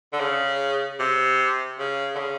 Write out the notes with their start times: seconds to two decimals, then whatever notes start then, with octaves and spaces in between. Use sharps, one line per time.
0.13 D3
0.20 C#3
0.99 C3
1.79 C#3
2.15 D3
2.19 C#3